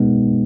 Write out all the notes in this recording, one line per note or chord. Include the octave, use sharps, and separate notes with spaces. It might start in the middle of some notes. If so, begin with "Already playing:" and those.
Already playing: B2 G#3 B3 D#4